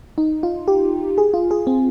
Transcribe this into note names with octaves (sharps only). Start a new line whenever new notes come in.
D#4
F4
G4
G#4
F4
G#4
C4